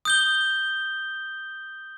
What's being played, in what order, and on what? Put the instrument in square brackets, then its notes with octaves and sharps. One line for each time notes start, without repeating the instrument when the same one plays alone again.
[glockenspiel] D#6 G6 G7